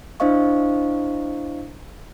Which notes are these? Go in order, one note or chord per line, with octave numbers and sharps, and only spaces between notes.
D4 E4 C5 D#5 F5 C#6